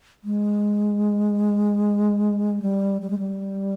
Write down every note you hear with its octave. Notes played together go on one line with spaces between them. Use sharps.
G#3
G3
G3
G#3
G3